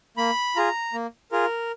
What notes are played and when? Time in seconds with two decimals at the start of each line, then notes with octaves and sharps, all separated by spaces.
0.17 A#3 B5
0.56 F4 G#4 A#5
0.93 A#3
1.32 F4 G#4 A#4